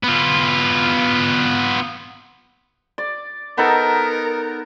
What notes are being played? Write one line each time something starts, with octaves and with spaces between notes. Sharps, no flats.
B3 F4
D5
B3 D#4 A4 A#4